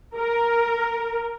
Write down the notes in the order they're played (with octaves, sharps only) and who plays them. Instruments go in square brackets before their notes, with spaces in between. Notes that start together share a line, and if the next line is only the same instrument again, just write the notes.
[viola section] A#4